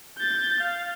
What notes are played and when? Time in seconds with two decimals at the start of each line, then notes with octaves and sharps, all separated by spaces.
0.18 G6 A6
0.60 F5